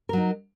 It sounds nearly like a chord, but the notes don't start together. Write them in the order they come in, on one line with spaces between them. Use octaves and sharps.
A#4 F#3 D#4